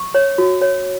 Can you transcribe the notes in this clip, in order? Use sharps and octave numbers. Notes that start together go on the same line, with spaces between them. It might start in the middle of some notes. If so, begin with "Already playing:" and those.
Already playing: C#6
C#5
F#4
C#5